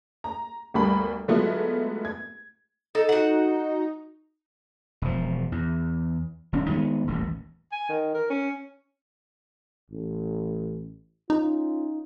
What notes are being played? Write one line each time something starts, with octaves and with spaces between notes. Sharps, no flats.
A#5
G1 D2 G3 A#4 B5
D3 F#3 G#3 A3 B3 F4
G#6
D#4 A4
F#4 F#5
E1 F3
E2
D#1 D#2 C#4 D4
D#3 G#3 A3 B3
D#1 A1 D#2
G#5
D#3
A#4
C#4
A1
C#4 D#4 F4